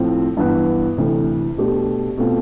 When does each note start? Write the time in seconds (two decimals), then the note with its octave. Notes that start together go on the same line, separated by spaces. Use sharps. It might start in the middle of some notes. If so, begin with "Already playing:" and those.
Already playing: A2 F3 C4
0.37 G2 E3 B3
0.98 D2 C3 E3
1.57 B2 A3 D4 G4
2.17 B2 A3 C4 F4